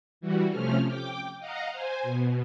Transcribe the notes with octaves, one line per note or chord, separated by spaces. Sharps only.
E3 G3 F#4
C3 F3 A3 C#4 F6
G5 D6
D#5 F5 F#5 A#5
C5 G#5
B2